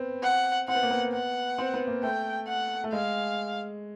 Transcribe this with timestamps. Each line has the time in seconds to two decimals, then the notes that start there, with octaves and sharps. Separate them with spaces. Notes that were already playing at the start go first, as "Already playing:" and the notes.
Already playing: B3 C4
0.23 F#5
0.68 C4 F#5
0.75 B3
0.83 A#3
0.91 B3
1.13 F#5
1.58 C4
1.74 B3
1.87 A#3
2.03 A3 G5
2.47 F#5
2.84 A3
2.92 G#3 F5